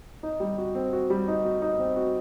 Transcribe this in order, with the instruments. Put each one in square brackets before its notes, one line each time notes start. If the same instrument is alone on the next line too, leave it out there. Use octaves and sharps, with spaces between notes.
[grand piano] D#4
G3
F#4
C4
F#4
G3
D#4
F#4
D#4
C4
F#4